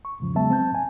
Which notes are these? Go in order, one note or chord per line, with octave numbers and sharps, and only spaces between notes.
C#6
E2 G#2 C#3 F3
C#3 F#3 G#3 B3 E5 A5
C4 A5 G6
A2 G#5